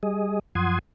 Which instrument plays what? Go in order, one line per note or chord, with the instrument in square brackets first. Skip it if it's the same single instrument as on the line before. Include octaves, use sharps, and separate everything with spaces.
[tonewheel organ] G3 G#4 D#5
F#2 F3 F#5 C6 D#6 G#6